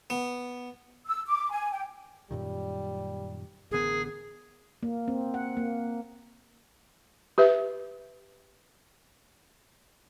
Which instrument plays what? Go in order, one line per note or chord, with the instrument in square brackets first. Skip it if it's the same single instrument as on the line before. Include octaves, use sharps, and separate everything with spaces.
[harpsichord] B3
[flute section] E6
D6
G#5
G5
[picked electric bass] F#2 A#2 D#3 [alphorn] G3
[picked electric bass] A1 D3 B3 [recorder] G#4 [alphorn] A#4
[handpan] A#3
C4
F#5
A#3
[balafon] G4 B4 E5